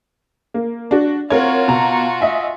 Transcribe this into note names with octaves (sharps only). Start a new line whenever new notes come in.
A#3
D4 F#4
C4 F4 F#4 A#4 C#5
B2 A#5
D#5 E5 G#5